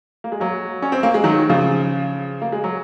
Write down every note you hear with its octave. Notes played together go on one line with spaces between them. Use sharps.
A#3
G#3
F#3 A#3
C#4
C4
A#3
G#3
D#3 F#3
C#3 F3
A#3
G#3
F#3